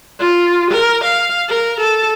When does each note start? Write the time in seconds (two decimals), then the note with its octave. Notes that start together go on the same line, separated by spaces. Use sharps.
0.19 F4
0.71 A#4
1.04 F5
1.49 A#4
1.80 A4